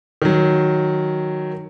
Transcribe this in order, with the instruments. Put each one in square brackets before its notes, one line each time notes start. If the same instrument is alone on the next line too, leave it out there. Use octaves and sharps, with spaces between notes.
[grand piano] D#3 F#3